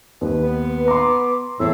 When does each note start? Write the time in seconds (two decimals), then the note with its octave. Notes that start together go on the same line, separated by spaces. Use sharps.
0.21 D#2 B4
0.43 B3
0.88 A#5 C6 D6
1.60 E2 A2 E6